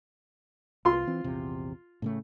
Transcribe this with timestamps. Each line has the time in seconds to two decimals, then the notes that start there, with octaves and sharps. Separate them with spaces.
0.85 C2 F4 C6
1.07 E3 C4
1.24 A#1 E2 C3
2.02 A2 C#3 A3